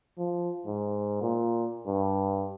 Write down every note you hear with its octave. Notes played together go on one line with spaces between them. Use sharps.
F3
G#2
A#2
G2